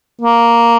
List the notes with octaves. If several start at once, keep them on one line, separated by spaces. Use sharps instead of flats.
A#3